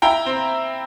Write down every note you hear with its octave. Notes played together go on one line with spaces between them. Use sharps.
E4 G5 A#5
C4